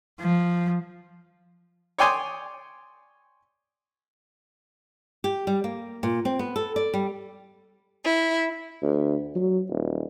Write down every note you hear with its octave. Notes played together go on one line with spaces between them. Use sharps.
F3
C#5 D5 G5 G#5 C6 D#6
G4
G3
A#3
A#2
C4
B3
A4
D5
G3
E4
D2
F#3
D#1